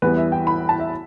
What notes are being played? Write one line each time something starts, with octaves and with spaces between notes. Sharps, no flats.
E2 E3 G3 B3 B4
E5
G5
B5
A5
E5